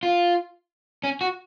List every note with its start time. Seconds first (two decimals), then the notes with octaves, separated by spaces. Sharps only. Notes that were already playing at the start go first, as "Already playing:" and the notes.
0.03 F4
1.04 C#4
1.21 F#4